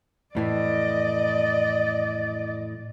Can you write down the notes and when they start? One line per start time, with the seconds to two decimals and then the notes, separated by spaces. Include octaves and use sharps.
0.35 F2 A2 E3 D5 D#5